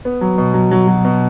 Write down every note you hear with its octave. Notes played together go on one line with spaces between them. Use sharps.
B3
F#3
B2
F#3
F#3
F#3
B2